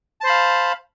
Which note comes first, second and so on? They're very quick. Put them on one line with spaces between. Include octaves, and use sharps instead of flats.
A5 C5 B5 F5